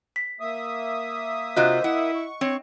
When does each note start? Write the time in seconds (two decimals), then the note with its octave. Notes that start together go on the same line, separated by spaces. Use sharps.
0.16 B6
0.40 A#3 E5 D#6
1.56 C3 F4 F#4 C5 D#5
1.84 E4 F#5
2.15 C#6
2.41 C4 C#5